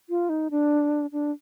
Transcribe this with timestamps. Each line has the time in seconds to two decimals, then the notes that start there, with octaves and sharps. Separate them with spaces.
0.09 F4
0.29 D#4
0.51 D4
1.12 D4